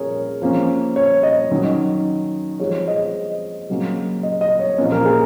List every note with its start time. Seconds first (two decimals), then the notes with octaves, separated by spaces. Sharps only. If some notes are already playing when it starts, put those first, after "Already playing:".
Already playing: A#2 F3 C#4 G#4 A#4 C#5
0.42 F3 A#3 C#4
0.96 C#5
1.23 D#5
1.51 D#3 F#3 C#4
2.60 F3 G#3 C4 C#5
2.88 D#5
3.69 C#3 F#3 A#3 C#4
4.23 D#5
4.41 D#5
4.60 C#5
4.78 A#2 F3 A#3 C#4
4.92 A#4
5.06 G#4